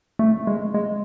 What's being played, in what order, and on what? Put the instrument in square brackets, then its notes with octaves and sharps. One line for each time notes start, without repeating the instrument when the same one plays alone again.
[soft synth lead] A3
G#3
G#3